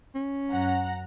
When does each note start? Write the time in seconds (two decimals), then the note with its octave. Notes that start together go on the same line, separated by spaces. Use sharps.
0.15 C#4
0.51 F#2 F#5 A#5